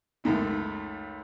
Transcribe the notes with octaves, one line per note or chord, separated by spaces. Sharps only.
C#2 F#2 A3 D#4